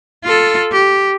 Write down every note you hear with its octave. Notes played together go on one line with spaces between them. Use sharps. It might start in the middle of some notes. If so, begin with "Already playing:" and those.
F4 A4
G4